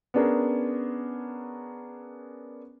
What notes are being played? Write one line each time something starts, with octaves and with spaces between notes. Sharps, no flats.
B3 C#4 D4 G#4 A#4